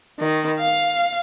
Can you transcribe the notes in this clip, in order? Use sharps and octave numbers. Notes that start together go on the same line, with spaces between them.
D#3
F5